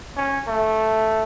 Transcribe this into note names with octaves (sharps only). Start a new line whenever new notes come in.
C#4
A3